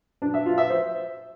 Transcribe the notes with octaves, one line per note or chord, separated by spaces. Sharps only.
D4
E5
F4
E5
C5